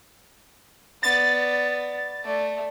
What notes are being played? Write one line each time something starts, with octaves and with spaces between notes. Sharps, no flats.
B3 D5 A6
A3 D5